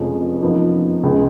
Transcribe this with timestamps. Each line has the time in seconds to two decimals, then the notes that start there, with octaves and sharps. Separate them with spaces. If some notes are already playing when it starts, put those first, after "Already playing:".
Already playing: F1 F2 F3 G#3 C#4
0.41 F#2 F3 B3 D#4
1.03 C#2 C#3 G#3